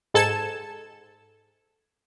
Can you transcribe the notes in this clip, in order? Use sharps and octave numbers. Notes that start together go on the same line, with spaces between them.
G#2 A4 A5 G#6 E7